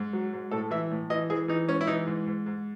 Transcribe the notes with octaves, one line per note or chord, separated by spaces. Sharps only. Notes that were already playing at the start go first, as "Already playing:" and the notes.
Already playing: G#2
F#3
G#2
A2 A4
E3 E5
A2
E3 D#5
E3 G#4
E3 D#4
G#2 C#4
E4
E3 D#4
G#2
G#2
G#2